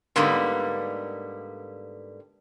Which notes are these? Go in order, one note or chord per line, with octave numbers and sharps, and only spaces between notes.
G#2 D3 G3 A#3 B3